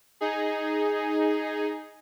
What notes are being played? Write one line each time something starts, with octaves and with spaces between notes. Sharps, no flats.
D#4 G#4